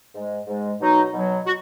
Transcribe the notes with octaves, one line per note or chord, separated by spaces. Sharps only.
G#2 G#3
G#2 G#3
B2 F#3 D#4
B2 F#3
F#4